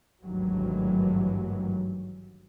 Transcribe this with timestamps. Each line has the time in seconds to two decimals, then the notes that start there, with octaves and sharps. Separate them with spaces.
0.23 G#1 D2 G2 D#3 E3 F#3